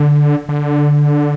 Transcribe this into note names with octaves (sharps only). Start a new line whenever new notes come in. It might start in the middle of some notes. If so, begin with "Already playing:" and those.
Already playing: D3
D3